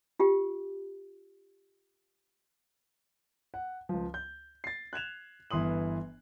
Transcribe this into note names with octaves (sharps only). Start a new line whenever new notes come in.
F4 G4 G5
F#5
C#2 F3
G6
A6 C7
F#6 G#6 E7 F7
G1 E3 C6 D#6 F#7